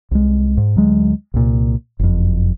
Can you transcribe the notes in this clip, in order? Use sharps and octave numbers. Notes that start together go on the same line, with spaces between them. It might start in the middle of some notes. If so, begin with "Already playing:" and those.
C2 G#3
G#2
D2 F#3 G#3
C2 A#2
F#1 F2